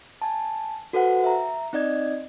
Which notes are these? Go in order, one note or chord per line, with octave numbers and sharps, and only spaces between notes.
G#5 A5
F#4 A4 B4 C5 F#5
E5 A#5
C4 D#4 D5 D#5 G#6